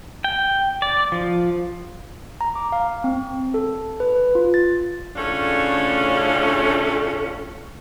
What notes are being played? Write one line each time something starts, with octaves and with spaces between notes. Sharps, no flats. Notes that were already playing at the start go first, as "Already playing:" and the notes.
G5
D5
F3
A#5
D6
F5
C4
A4
B4
F4
A6
A2 C#3 A3 C#4 D4 F4